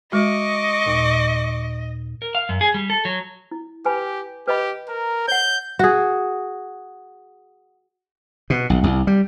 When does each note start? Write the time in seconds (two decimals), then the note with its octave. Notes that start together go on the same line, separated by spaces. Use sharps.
0.12 G#3 F#4 D#5 C#6 D6
0.86 D#2 A#2
2.22 A#4
2.35 F5
2.49 F#2
2.61 G#4
2.74 G3
2.90 A4
3.05 F#3
3.51 E4
3.85 G4 B4 G#5 B5
4.48 G4 B4 D#5 B5
4.89 A#4 A#5
5.28 C#5 F#5 G6
5.79 F#4 G#4
8.50 B2
8.70 B1
8.83 C2
9.07 G3